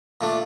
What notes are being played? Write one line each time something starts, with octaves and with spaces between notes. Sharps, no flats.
A#2 A3 D4